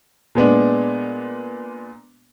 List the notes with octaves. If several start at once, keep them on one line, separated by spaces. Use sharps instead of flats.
A#2 G#3 B3 D4